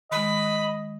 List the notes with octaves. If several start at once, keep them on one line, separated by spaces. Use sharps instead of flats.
D#3 G#3 D#5 B5